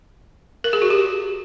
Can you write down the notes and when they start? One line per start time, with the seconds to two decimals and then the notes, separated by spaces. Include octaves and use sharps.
0.64 A#4
0.73 G#4
0.82 F#4
0.90 G4